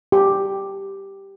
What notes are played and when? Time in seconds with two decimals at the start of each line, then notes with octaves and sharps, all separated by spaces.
0.12 G4